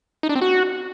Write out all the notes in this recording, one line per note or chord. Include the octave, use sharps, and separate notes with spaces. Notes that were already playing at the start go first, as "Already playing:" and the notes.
D#4
D4
C4
F#4